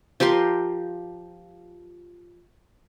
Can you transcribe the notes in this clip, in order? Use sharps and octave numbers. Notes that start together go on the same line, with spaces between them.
F3 G4 A#4 C6